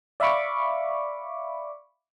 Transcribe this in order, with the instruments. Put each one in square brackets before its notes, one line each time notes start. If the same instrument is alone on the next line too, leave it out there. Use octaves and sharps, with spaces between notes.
[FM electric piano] D5 E5 F5 B5 C#6 D6